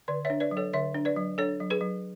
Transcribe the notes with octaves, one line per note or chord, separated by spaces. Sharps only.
D3 B4 D5
C#5 E5
D4
B4 D5
F#3
A4 C#5
D3 C#5 E5
D4
B4 D5
F#3
D4 A4 C#5
F#3
G#4 B4
F#3